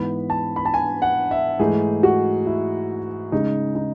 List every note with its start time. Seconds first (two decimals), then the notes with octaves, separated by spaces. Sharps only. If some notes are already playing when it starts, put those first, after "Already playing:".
Already playing: G#2 E3 B3 B5
0.30 A5
0.56 B5
0.65 A5
0.74 G#5
1.02 F#5
1.31 E5
1.59 G#2 E3 A3 D#4 G#4
2.03 F#4
2.46 E4
3.32 C#3 G#3 D#4
3.75 D#4